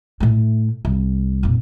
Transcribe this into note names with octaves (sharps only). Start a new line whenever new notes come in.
A2 A3
C2
F1 A#2